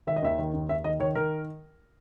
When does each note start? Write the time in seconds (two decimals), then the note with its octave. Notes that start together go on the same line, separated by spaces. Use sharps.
0.07 D#3 E5
0.16 D#5
0.23 D#2 E5
0.39 D#3
0.54 D#2
0.69 D#2 E5
0.84 D#3 D#5
1.00 D#3 C#5
1.15 D#3 A#4